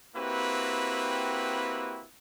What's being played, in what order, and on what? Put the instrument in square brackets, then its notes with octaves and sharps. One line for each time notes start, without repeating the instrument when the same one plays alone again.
[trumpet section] A#3 C4 E4 F#4 G4 B4